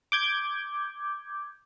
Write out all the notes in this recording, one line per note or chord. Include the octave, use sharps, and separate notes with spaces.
D6 G6 G#6